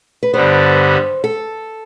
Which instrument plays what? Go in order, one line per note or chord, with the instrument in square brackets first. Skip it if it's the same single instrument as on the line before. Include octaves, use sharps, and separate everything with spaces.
[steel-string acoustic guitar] B4
[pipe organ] G2 D3 G3 B3 [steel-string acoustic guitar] C5
[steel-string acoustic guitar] A4